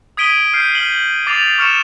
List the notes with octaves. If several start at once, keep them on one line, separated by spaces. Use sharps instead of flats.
D#6 G#6 B6 D7 D#7 G7
F6 G6 C7
F6 D#7 F#7 G7
D6 A6 C7 F7
C#6 F6 C#7 E7